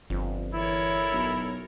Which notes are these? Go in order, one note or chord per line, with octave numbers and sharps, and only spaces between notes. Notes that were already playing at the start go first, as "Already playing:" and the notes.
G1 F2
E3 E4 A4 A#4 C#5
B1